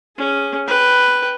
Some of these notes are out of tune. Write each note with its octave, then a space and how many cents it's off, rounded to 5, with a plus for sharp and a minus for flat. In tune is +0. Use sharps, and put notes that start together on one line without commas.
C#4 +0 G#4 +0
B4 +0 G5 +0